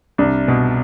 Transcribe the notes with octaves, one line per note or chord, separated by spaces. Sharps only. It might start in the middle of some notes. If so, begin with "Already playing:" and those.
C2 D4
B2